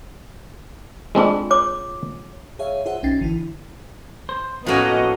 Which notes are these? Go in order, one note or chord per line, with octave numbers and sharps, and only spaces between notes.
G#3 C4 D4 F4 G#4
C#5 D6
G#4 C#5 E5 F5
F4 G#4 C5 E5 F#5
B1 C#4 D#4 G5 A6 C7
G#1 D3 E3 E4
C5
A2 F3 A#3 B3 C#4 F#4 D#5 G#5